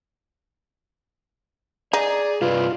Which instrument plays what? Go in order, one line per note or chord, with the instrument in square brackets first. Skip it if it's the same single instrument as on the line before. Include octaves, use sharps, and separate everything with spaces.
[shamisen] D#4 [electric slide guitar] G#4 [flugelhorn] D5
[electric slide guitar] G2 C3 D5 [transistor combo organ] F4 [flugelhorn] B4